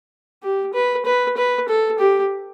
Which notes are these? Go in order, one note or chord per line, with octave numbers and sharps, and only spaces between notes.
G4
B4
B4
B4
A4
G4